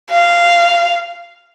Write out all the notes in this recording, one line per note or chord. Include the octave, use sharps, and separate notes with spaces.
F5